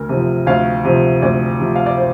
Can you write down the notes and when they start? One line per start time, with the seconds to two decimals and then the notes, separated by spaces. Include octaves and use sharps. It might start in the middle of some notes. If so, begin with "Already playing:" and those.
Already playing: D2 A#4
0.09 C3 F3
0.47 D2 F5
0.85 C3 F3
1.22 D2 D5
1.60 C3 F3
1.76 F5
1.86 D5
1.97 C5